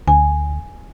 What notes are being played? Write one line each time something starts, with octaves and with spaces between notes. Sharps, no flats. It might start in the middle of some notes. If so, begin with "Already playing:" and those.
D2 G#5